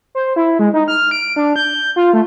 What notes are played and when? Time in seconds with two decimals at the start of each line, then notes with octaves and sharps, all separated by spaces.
0.15 C5
0.36 E4
0.59 G#3
0.74 D#4
0.88 F6
1.11 D7
1.36 D4
1.56 G6
1.96 F4
2.13 A3